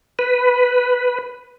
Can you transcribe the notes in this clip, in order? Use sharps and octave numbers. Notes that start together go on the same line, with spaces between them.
B4